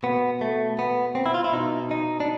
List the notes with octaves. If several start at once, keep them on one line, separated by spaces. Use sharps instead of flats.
B2 B3
A3
B3
C4
E4
F4
E4
B2 D#4
D#4
D4